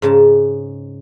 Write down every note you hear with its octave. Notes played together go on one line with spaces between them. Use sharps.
G#2 C#3 A5